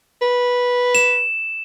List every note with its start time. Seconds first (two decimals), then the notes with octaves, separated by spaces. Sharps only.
0.22 B4
0.95 E7